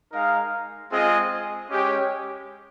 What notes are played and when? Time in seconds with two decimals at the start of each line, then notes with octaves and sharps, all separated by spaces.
0.12 G#3 D#4 A#4 F5
0.90 G#3 C4 F4 G#4 D#5
1.69 G#3 C#4 G4 C#5